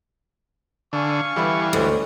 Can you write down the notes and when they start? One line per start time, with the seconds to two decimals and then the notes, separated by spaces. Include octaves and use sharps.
0.93 D3 F5 G#5 C#6
1.36 E3 G3 B3 E4 A4
1.73 D2 G#3 C#4